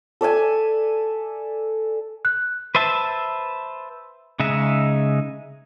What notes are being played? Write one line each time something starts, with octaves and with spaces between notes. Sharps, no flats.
A4 D5 E5 G#5
F#6
B4 C5 E5 A5
C#3 G#3 D#4 E5